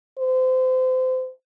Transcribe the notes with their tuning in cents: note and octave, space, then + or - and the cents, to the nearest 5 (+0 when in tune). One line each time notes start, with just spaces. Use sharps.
C5 -30